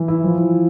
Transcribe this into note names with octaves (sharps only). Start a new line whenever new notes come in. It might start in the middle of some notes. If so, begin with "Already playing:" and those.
Already playing: E3
E4
F3